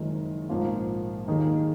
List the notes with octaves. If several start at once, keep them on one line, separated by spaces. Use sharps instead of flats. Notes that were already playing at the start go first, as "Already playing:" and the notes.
Already playing: F#1 F2 D#3 G#3 D#4
A#1 G#2 F3 A#3 F4
D#2 D#3 A#3 D#4 G#4